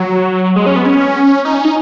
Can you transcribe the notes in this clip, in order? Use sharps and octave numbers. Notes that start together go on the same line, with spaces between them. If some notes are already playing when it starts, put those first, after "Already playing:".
Already playing: F#3
G#3
C#4
B3
C#4
D#4
C#4
D#4